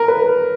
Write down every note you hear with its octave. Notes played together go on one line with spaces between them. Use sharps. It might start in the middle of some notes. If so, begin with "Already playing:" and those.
Already playing: A#4
B4